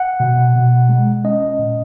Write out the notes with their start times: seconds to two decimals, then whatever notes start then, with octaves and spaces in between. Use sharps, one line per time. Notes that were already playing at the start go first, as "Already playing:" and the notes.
Already playing: F#5
0.20 B2
0.55 B2
0.89 G#3
1.24 C#4 D#5
1.59 A#2